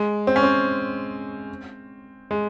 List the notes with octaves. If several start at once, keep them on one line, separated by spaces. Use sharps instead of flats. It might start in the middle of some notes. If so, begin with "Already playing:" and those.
Already playing: G#3
C4
C#4
C4
G#3